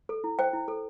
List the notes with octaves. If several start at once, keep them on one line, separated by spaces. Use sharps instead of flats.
A4
E4
C5 G5
E4
A4